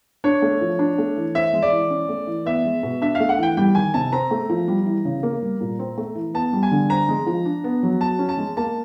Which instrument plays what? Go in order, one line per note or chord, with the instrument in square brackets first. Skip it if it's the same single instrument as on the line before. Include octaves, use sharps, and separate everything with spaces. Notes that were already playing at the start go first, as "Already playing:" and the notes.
[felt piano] D4 [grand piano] C#5
[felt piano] A3
F3
D4
A3
E3
[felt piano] C4 [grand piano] E5
[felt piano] G#3
[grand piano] D5
[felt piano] E3
C#4
A3
E3
[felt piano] B3 [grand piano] E5
[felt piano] G#3
B2
[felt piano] D4 [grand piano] E5
[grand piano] F5
[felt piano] A3
[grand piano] F#5
[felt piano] E3 [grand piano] G5
[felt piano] G3 [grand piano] G5
[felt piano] D#3 [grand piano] G#5
[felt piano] C3 [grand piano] A5
[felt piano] C4 [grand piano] A#5
[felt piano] A3
F3
G3
E3
C#3
A#3
G3
A#2
C4
A3
E3
[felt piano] B3 [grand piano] A5
[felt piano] G3
[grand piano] G#5
[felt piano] D3
[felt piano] C4 [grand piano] A#5
[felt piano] G#3
F3
D4
B3
F#3
[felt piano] F#4 [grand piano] A5
[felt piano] C#4
[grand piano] A5
[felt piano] G#3
[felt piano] A#3 [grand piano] A5